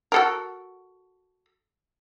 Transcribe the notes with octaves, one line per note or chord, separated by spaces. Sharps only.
F#4 A4 A#4